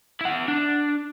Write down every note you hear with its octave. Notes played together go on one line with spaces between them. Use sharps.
E4 F#5
D4